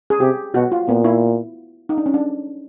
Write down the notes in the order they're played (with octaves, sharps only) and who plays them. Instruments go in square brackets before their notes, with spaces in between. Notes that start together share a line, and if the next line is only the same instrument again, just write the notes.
[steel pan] G#4
[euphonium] C3 [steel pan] G4
[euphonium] B2 [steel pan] F#4
[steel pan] F4
[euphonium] A#2 [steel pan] B3
[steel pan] E4
D#4
D4
C#4
D4